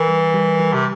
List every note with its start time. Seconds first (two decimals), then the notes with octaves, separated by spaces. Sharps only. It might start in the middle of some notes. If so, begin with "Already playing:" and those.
Already playing: E3 A#4
0.08 G3
0.34 G3
0.60 G3
0.74 C3